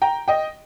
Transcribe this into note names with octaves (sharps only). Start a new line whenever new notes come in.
G5 A#5
D#5 G5